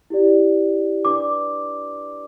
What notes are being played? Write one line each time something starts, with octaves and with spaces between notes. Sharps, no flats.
E4 G4 D5
D4 B4 D5 D6